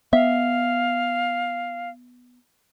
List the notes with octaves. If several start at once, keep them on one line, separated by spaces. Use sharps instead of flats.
B3 E5 F5